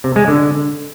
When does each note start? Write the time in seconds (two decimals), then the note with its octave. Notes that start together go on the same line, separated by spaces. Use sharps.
0.04 C3
0.16 G#3
0.28 D3